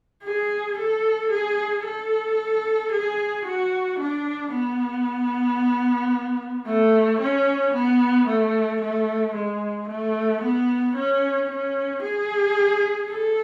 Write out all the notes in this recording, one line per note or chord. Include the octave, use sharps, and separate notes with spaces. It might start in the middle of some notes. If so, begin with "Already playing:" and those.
G#4
A4
G#4
A4
G#4
F#4
D4
B3
A3
C#4
B3
A3
A3
G#3
A3
B3
C#4
C#4
G#4
A4